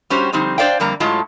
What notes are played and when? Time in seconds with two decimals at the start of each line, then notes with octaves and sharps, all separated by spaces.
0.10 G3 C#4 F#4 G4 C5
0.33 D3 F3 G3 C4 D#4
0.58 D4 C5 D5 F5 G5
0.80 F2 D3 G3 A#3 A#5
1.00 A2 F#3 G#3 F4 A5